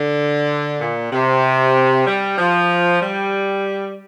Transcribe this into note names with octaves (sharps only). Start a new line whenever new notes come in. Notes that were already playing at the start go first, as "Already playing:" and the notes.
Already playing: D3
A#2
C3
G3
F3
G3